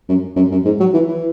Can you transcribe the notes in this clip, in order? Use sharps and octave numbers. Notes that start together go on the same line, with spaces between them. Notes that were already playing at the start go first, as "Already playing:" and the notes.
F#2
F#2
F#2
G#2
F#3
E3
E3